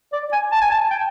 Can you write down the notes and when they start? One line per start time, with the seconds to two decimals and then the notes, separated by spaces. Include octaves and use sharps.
0.13 D5
0.32 G#5
0.52 A5
0.61 G#5
0.71 A5
0.91 G5